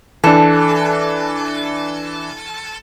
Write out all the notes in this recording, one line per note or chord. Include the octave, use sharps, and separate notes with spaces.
E3 D4 A4